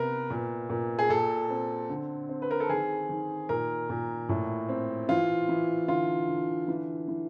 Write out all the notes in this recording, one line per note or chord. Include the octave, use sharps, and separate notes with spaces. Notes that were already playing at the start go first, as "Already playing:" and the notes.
Already playing: C3 B3 A#4 B4
A#2
A#2
G#4
A#2 A4
C4
D3
C4
B4
A#4
A4
D#3 G#4
D#3
A#2 A#4
A#2
A2
C4
E3 F4
E3
D3 F4
D3
E3
E3